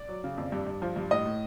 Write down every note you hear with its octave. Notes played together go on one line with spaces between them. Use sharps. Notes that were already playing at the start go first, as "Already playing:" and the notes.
Already playing: D5
F#3
C#3
F2
G2
G2
F3
G2
A2 D#5
A2